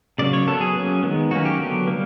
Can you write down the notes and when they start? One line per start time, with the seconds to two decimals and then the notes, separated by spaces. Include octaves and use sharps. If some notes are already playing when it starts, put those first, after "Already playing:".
0.19 C#3 F#3 A#3 D5
0.33 C#5
0.47 F#3 B3 A4
0.61 G#4
0.76 F#3 A#3 C#4
1.03 D#3 G#3 B3
1.31 F#3 A#3 C#4 F#4
1.45 G4
1.60 D3 F#3 B3
1.87 G3 A#3